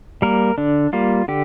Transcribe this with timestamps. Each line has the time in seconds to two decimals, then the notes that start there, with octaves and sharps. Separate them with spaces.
0.22 G3 A#3 A#4
0.58 D3 D4
0.93 G3 A#3 F4
1.28 D3 G4